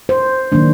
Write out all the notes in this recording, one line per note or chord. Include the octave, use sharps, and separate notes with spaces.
C5
D#3 F#3 A#3 D4